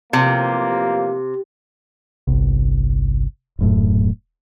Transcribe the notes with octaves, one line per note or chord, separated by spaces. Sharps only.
A1 C3 F3 A#3
G1 C2
D#1 F#2 A2